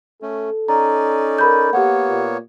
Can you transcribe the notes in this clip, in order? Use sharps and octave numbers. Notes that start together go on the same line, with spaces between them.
A3 C#4 A4
C#4 D#4 D5 A#5
A#4 B5 G6
A#3 B3 G4 C#5 F#5
A#2